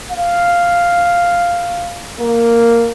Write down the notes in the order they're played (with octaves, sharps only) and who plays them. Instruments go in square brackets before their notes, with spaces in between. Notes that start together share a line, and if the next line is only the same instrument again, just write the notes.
[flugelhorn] F5
A#3